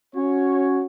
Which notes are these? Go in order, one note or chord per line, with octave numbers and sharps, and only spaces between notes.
C#4 F#4 C#5